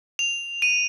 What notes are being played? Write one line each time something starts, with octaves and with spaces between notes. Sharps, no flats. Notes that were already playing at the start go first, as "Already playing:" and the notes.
F7
D#7